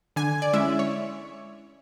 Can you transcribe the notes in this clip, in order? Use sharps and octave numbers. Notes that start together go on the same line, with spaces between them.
D3 G#5
D5
G#3 C#4 E4 E5
C#5